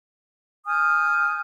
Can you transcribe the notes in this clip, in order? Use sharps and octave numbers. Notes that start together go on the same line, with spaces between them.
G#5 D#6 F6 G6